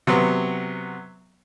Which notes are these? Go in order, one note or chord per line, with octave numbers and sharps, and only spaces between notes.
C3 F#3 B3